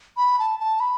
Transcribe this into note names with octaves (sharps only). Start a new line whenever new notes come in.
B5
A5
A5
B5